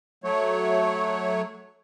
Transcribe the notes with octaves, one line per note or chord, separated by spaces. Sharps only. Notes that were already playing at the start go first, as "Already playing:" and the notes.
F#3 A3 C#5